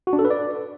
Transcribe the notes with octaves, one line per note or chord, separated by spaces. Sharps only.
F#4
D4
A4
B4
D5